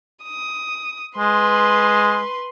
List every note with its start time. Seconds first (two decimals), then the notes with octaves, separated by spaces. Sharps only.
0.24 D#6
1.18 G#3 B4 C6